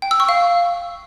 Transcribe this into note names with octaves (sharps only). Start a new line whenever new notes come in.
G5
E6
C#6
F5